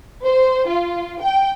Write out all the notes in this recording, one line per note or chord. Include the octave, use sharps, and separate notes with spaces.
C5
F4
G5